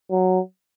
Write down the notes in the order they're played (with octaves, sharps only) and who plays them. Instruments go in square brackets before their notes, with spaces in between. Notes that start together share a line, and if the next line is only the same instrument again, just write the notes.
[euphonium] F#3